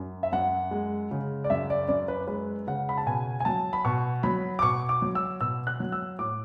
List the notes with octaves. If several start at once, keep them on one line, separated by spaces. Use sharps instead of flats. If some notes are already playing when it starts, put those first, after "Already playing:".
Already playing: F#2
E5
F#2 F#5
G#3
C#3
D5
F#2 E5
D5
F#2 D5
B4
G#3 B4
C#3 F#5
B5
A5
B2 G#5
G#5
F#3 A5
B5
B2 C#6
F#3 B5
D6
B2 C#6
D6
F#3
E6
B2 E6
F#6
F#3
E6
A2 D6